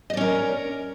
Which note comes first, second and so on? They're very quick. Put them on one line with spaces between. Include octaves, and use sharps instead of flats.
D#5 D5 C#4 A#4